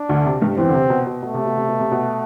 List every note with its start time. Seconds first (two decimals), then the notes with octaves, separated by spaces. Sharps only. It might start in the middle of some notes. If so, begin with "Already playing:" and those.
Already playing: D4
0.09 D2 D3
0.26 C3
0.42 G2 G3
0.57 E2 E3 C4
0.69 D3
0.74 C3
0.90 B2
1.07 B2
1.23 B2 A3
1.34 C3
1.46 B2
1.57 C3
1.69 B2
1.80 C3
1.92 B2